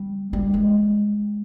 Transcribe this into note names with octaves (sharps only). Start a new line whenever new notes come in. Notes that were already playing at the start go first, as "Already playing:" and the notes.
Already playing: G3
G3
G#3